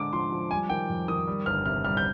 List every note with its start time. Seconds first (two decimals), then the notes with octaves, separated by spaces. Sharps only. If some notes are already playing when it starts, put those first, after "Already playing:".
Already playing: D3 G#3 D6
0.13 F3 C6
0.32 F3
0.51 G3 G#5
0.69 D#3 G5
0.89 F2
1.08 D#3 D#6
1.27 G3
1.46 G1 F6
1.65 C3 F6
1.84 G3 F6
1.97 G6